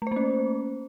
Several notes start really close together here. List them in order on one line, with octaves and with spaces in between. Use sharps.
A3 C5 A#3 C#4